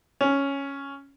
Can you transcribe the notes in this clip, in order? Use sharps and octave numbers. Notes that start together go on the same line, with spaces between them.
C#4